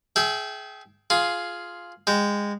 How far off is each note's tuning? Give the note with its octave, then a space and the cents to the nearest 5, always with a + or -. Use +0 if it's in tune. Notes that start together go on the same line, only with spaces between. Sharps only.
G#4 +25 E5 +0 G5 -15
F4 +0 G#4 +10
G#3 -20 G5 -15